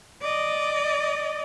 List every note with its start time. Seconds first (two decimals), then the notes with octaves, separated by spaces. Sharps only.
0.22 D5 D#5